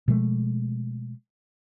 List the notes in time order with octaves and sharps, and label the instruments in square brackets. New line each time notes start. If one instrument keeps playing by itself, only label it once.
[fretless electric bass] B2 F3 G#3 A3